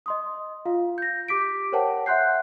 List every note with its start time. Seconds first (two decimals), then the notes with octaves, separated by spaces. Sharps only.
0.06 D#5 C6 D#6
0.65 F4 F5
0.98 G6 A#6
1.28 G4 D6 B6 D7
1.72 A#4 C5 C#5 F#5 G5 A5
2.06 E5 F#5 C6 F#6 G6 C7